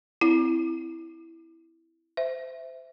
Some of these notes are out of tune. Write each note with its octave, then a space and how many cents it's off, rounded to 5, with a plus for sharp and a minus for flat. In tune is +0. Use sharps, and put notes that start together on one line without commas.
C4 -15 E4 +0
C5 -25 E5 +0